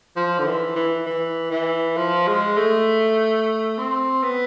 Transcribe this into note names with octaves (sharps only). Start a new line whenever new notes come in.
F3
D3
E3
E3
E3
E3
F3
G#3
A3
C4
B3